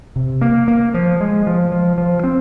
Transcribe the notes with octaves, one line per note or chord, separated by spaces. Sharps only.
C3
A#3
A#3
F3
G#3
F3
F3
F3
C4